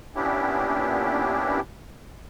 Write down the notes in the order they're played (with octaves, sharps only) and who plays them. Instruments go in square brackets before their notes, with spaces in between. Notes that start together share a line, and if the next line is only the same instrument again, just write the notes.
[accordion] A#2 B3 C#4 D4 E4 G4